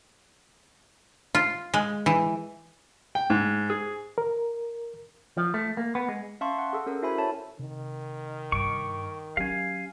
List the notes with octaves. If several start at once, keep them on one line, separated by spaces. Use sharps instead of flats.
F4
G#3
E3
G5
G#2
G#4
A#4
F3
A3
A#3
B3
G#3
C#4 E5 F5 A5 C6 C#6
F#5
G#4 A4
C#4 A4 A#4
E4 F#4 C5 E5 G#5 B5
A4 C#5 E5 A5
C3 D#3
G2 C#6 D6
F#3 C#4 G4 F5 G#5